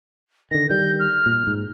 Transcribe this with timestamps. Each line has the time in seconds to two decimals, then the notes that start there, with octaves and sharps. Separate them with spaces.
0.51 D3 D#3 A#6
0.69 D#3 G3 G6
0.99 F6
1.26 A#2
1.47 G#2